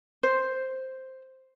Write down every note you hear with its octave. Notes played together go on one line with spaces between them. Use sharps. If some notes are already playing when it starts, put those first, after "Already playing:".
C5